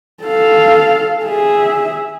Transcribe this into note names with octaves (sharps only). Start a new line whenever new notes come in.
A4 F5
G#4 E5